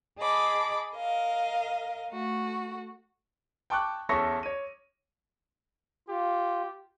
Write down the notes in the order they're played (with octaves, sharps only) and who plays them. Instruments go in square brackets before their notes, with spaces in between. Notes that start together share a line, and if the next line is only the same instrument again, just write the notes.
[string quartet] G#4 D#5 A5 B5 D6
A#4 D#5 F5
A3 F#4
[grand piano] G5 A5 C#6 D6 F#6
E2 C#4 A4 E5 C#6 A#6
C#5 D#7
[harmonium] F4 [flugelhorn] G4